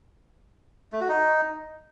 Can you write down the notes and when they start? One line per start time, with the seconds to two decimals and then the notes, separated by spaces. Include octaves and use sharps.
0.93 A3
1.01 F#4
1.09 D#4